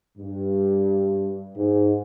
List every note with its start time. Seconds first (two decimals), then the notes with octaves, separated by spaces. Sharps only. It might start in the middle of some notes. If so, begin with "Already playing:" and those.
0.17 G2
1.56 G#2